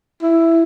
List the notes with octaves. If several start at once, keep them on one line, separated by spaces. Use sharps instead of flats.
E4